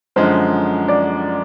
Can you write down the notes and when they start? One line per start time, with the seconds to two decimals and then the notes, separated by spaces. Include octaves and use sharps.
0.16 F#2 D3 F3 G#3 C5
0.88 D5